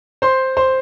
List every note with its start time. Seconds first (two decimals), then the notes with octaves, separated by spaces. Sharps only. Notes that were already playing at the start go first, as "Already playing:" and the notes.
0.22 C5 C6
0.57 C5 C6